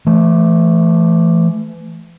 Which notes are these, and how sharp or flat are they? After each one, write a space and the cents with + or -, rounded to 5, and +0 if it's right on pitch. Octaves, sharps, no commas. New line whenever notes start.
E3 +35 A3 +0